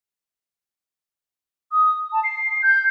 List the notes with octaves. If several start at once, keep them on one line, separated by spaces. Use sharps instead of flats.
D#6
A5
C7
G6